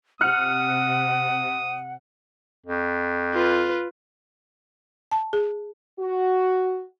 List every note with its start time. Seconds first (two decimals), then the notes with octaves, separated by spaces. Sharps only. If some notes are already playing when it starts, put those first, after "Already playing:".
0.21 C3 F#5 D#6 F6 F#6 C#7
2.66 F2
3.34 F4 B4
5.11 A5
5.33 G#4
5.99 F#4